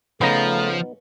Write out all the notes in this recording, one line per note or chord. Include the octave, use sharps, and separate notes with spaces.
C#3 F3 A3 B3 D#4 A#5